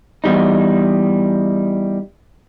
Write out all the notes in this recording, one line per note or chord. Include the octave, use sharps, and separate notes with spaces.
E2 G3 D#4